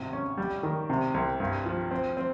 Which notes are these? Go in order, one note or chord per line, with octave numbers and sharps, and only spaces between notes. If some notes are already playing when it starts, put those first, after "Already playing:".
Already playing: G#1 C3
C#4
G3
D#3
C3
C2
G2
F3
C4
C4